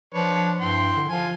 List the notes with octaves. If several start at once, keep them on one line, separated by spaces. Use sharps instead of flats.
F3 D4 B4 C#5
G2 E3 G5 C6
D3
F3 F4 G#5